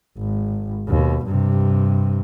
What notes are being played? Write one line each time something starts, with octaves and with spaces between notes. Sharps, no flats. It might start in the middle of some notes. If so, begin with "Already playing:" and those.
G#1
D#2 B2
G2 C3